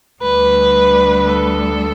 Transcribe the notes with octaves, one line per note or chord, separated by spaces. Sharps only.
D2 D3 G3 B4
A4